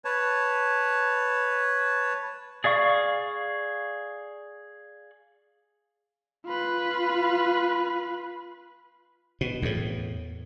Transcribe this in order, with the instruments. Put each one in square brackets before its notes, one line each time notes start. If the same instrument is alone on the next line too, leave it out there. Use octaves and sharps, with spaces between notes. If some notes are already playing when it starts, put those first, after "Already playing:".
[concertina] B4 C#5 A5
[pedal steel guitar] G#4 D5 F5 C#6
[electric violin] F4 B4
[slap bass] B2
E2 A2